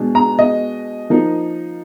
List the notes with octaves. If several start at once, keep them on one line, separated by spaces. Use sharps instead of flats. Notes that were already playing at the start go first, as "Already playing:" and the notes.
Already playing: B2 G#3 D4
A#5
D#5
F3 A#3 D#4